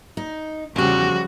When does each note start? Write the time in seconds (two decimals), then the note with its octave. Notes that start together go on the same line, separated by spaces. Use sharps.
0.17 D#4
0.76 E2 C#3 F3 G3 F#4 G4